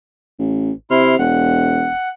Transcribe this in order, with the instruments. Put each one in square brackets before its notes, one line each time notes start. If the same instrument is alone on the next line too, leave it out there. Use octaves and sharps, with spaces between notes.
[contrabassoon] A1
[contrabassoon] C3 [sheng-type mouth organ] E4 C6 F6
[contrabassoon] E1 [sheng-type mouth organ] F#5